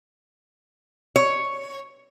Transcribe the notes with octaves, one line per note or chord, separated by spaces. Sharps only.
C#5